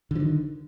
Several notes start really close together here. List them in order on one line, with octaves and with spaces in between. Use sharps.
D3 F3 D#3